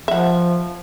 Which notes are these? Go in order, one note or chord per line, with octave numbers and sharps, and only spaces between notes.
F3 E5 F#5